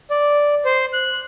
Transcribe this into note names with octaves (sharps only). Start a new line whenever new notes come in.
D5
C5
F#6